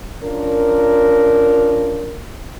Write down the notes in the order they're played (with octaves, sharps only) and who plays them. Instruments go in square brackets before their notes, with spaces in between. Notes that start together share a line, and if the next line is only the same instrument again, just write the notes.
[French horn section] C#4 D4 F4 A#4